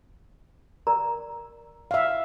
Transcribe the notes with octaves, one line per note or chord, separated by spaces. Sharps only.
A#4 D5 A#5
E5 F5